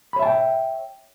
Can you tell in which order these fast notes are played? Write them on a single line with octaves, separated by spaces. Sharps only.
B5 C#5 E5 A5 G5